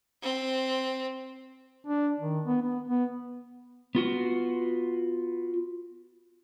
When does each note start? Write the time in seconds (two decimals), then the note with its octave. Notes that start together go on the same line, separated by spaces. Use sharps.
0.22 C4
1.86 D4
2.20 D#3
2.45 B3
2.62 B3
2.88 B3
3.95 B3 F4 F#4